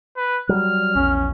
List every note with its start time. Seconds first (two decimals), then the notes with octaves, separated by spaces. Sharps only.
0.17 B4
0.49 F#3 G3 F6
0.95 A#1 E2 C#4